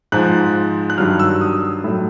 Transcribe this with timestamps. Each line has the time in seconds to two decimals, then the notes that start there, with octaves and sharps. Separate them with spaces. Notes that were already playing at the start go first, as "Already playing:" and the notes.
0.12 G#2 F3 F#6
0.90 F#6
0.98 G2 D#3 F#3 F6
1.19 E6
1.41 D#6
1.84 A2 F#3